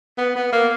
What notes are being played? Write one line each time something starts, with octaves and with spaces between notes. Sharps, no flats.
B3
B3
A#3